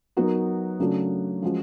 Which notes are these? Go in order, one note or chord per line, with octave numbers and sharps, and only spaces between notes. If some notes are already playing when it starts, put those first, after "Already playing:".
F#3 B3 D#4 F#4 A#4
C#3 F#3 A3 D4 F#4
F3 G#3 C#4 F#4